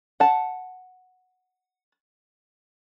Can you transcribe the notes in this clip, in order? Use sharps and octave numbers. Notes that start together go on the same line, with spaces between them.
F#5 A5